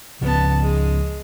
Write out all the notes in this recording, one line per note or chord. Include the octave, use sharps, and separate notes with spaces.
C#2 C#3 F3 B3 A5
G#3